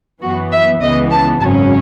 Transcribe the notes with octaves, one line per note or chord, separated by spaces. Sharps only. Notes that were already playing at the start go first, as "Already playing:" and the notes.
F#2 E3 B3 F#4
E5
C#2 C#3 E3 B3 D#5
A5
G#1 F#2 C#3 F#3 C#4 A5